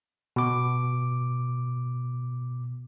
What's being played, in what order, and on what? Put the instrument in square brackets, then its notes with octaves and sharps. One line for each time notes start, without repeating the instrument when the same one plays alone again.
[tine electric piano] B2 D6